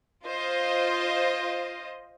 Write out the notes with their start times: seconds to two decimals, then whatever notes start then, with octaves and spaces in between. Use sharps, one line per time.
0.24 F4 C5 D#5